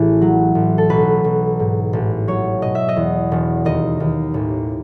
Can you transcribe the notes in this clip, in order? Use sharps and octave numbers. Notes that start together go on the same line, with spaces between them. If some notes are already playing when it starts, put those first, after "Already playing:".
Already playing: A1 E3 E4 G#4
F#3
A1
A4
B1 B4
B1
G#2
A1
F#3 C#5
B2 D#5
E5
D#5
E2
E1
D#2 D#5
D#2
A1